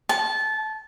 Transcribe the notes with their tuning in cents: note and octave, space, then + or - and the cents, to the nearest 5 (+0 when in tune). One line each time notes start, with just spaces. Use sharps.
A5 -20